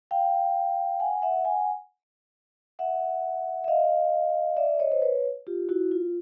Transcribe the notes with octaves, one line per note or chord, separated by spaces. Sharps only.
F5 G5
F#5 G#5
E5 F#5
F#5 G#5
E5 F#5
E5
D#5 F5
D5 E5
C#5 D#5
C5
B4 C#5
F4 G4
E4 F#4
F4